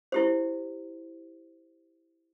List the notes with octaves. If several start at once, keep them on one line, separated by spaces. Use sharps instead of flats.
E4 G4 C5